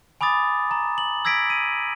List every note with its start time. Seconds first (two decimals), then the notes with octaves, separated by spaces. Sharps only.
0.21 G#5 B5 D6 D#6 A6
0.71 A#5
0.98 F#7
1.25 E6 G#6 A#6 B6 D7
1.50 D#7